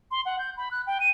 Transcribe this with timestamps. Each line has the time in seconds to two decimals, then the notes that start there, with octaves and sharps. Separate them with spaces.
0.11 C6
0.25 F#5
0.39 G6
0.57 B5
0.71 F#6
0.87 G5
1.00 D#7